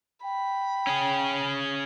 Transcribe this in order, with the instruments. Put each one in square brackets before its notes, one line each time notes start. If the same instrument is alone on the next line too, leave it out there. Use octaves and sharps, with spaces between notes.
[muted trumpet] G5 [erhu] B5
[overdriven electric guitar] C#4 G#4